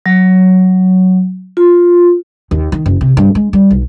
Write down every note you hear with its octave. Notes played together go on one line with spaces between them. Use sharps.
F#3
F4
D#2
D#3
F#1
C3
G2
G#3
G3
B1